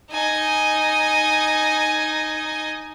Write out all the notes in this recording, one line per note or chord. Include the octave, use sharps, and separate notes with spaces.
D#4 G#5